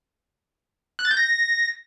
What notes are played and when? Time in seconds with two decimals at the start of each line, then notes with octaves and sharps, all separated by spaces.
0.99 F#6
1.05 A6
1.11 G6
1.17 A#6